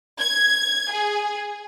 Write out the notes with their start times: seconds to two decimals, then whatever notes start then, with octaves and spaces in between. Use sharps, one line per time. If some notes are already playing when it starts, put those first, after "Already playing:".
0.18 G#6
0.90 G#4